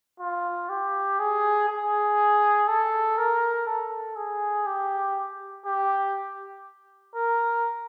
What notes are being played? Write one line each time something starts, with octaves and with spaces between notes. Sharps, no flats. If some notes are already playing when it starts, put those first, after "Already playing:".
F4
G4
G#4
G#4
A4
A#4
A4
G#4
G4
G4
A#4